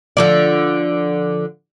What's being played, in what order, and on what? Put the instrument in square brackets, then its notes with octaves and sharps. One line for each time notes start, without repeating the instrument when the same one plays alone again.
[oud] D3 F3 D5